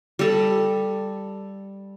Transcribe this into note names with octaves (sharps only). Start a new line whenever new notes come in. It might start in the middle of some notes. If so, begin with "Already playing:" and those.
G3 A4